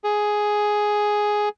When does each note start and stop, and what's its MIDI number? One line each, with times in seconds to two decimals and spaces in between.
0.04 1.49 68